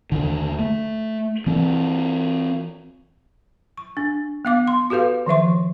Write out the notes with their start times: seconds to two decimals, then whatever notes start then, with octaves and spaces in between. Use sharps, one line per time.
0.12 D#2 D3
0.59 A3
1.46 E3 C4
3.77 C#6
3.97 D4
4.45 B3 F5 D6
4.68 C6
4.90 F#4 G4 A4 B4 F5
5.26 D#3 F3 E5 C#6